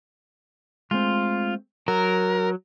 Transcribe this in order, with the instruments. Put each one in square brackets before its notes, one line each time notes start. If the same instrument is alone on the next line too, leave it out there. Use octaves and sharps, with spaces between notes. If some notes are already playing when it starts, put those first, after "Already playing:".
[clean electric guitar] G#3 A3 C4 [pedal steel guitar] F4
[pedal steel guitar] F#3 [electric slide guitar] A#4 [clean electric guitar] F#5